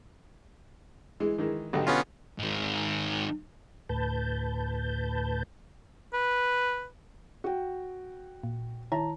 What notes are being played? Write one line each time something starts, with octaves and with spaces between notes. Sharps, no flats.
E3 G#3
D#3 E3 G#3
B1 D3 G4
B3 C#4 F4
G#2 D#3
D2 A2 B4 A5 G6
B4
F#4 G5
A#2
D#3 E4 C#5 A5 A#5